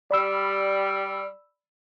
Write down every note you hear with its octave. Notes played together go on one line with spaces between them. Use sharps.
G3 D5 B5 E6